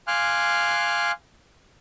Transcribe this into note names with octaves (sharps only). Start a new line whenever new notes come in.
F5 G#5 C6 D6 F6 F#6